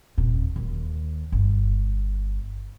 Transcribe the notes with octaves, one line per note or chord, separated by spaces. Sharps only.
D#1 A#2
D#2
G1